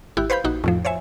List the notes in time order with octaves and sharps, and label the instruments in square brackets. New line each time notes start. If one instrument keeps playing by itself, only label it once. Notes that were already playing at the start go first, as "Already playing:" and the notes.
[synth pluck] G#1 E4 G4 F#6
B4 C5 F5 B5 G6
A#1 D#4 F#4
F2 A2 F3
C5 C#5 E5 G#5